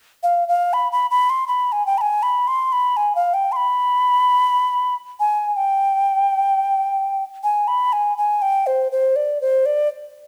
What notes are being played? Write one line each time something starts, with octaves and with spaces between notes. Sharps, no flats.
F5
F5
B5
B5
B5
C6
B5
G#5
G5
B5
G#5
B5
C6
B5
G#5
F5
G5
C6
B5
G#5
G5
G#5
B5
G#5
G#5
G5
C5
C5
D5
C5
D5